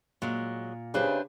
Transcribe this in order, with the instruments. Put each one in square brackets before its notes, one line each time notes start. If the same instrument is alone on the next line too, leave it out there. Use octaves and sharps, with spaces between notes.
[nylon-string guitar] A#2 [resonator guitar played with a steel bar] F#3 G#3
[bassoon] C#3 [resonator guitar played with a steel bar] D4 B4 C5 [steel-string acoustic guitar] G4 G#4 E5